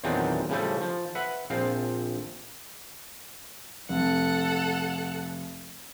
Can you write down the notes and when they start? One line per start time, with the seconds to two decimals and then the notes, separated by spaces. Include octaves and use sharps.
0.04 E2 A#2 D#3 F#3 C4 D4
0.49 A2 C#3 F3 G3 A3
0.81 F3
1.15 B4 E5 F#5
1.50 A#1 F3 C4 F5
3.89 F1 A4 F#5